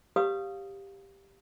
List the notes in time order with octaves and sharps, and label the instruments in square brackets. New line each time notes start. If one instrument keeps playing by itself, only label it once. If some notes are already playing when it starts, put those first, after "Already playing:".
[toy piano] G4 B4 C#5 F5 D#6